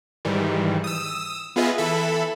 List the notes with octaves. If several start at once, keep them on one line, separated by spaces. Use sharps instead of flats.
G#2 D#3 E3 G3
D#6 E6
B3 F4 G#4 B4 D#5 E5
E3 A4 E5 B5